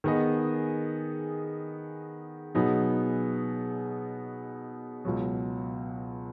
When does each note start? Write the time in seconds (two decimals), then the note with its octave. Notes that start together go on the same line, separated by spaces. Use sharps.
0.04 D#3 B3 G#4 D#5
2.55 B2 F#3 B3 D#4 G#4
5.05 C#2 B2 F#3